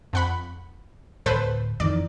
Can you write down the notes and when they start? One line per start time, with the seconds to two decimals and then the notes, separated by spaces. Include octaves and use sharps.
0.13 F2 F#5 B5
1.26 D1 A4 B4 C5
1.80 F2 D#3 E3 D5